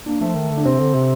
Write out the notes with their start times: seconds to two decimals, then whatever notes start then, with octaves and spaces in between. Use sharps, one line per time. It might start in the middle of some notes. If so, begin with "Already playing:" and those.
0.06 A#3 D4
0.20 F3 A3
0.36 D#3
0.50 D3
0.57 D4
0.65 C3 C4
0.80 D3
0.94 C3